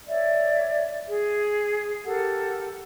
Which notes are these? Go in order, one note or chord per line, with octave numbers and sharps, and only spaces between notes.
C#5 D5 E5
G#4
G4 A4 A#4 F#5